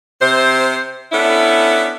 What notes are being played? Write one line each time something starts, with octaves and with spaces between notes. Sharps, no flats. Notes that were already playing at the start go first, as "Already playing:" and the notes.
C3 C5
B3 C#4 D4 E4 A4